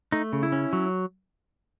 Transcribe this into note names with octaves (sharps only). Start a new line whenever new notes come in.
A3 D#4
C#3
E4
C#4
F#3